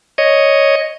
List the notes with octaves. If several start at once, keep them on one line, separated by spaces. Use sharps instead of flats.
C#5 D#5